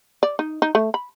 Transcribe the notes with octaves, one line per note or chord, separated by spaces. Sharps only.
D5
D#4
D#4
A3
B5